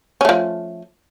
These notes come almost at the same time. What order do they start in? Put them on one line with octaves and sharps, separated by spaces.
C#4 A3 F3